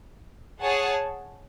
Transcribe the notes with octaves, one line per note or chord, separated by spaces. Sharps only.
G#4 C#5 F#5 A5